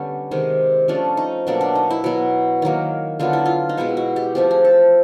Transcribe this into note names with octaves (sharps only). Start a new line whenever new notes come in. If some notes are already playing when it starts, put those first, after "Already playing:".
Already playing: D3 G3 B3 C#4
C3 D#3 G#3
F3 A3 C#4 D4
D#4
B2 F#3 A#3 D4
D4
D#4
E4
B2 F#3 B3
D#3 F#3 A#3
D3 F#3 B3 F4
E4
F4
D#4
B2 G#3 B3 E4
F#4
G4
F3 A3 C4 G4
G#4
A4